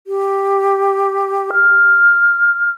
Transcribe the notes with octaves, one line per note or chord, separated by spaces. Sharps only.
G4
F6